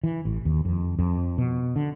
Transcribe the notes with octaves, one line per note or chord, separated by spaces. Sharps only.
E3
A1
D#2
F2
F2
B2
D3